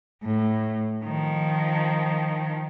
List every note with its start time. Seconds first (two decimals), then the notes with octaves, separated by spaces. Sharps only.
0.23 A2
1.05 D#3 F3